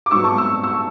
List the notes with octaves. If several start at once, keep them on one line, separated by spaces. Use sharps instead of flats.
D6
G#2 F#3 B3 C#6 E6
A5 C#6
C#6 E6
C#6 E6